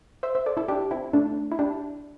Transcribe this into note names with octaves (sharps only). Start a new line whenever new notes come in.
C5 E5
C5 E5
A4 D5
E4 A4
D4 G4
C4 E4
A3 D4
E4
D4 G4